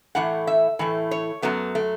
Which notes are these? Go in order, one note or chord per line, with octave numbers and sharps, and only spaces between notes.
A2 E3 A3 F#5
E5
A2 E3 A3
C#5
F#2 F#3 A3 B3
A3